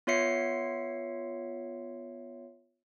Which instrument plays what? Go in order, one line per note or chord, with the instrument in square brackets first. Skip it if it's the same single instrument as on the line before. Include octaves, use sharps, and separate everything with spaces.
[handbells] B3 F4 C#5 E5 C7 C#7